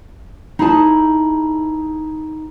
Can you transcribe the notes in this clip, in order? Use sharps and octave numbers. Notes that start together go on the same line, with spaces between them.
D#4 E4 G#4 B4 A5